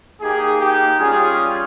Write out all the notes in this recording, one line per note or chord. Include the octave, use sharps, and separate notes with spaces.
A#3 D#4 G4 G#4
G4
G3 C#4 F4 G#4